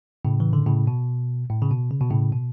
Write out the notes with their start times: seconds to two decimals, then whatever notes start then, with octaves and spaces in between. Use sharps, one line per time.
0.25 A2 C#3
0.40 E3
0.53 D3
0.66 A2 C#3
0.87 B2
1.50 A2
1.62 C#3
1.71 B2
1.91 C#3
2.01 B2
2.10 A2 C#3
2.33 B2